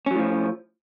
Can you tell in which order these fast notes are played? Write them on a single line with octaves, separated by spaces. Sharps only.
C#4 F#3 A2 F3